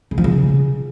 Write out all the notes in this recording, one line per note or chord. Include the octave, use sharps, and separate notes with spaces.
C#3
F3
C#3